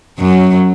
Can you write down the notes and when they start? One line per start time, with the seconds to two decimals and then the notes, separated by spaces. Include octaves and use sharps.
0.19 F#2 F#3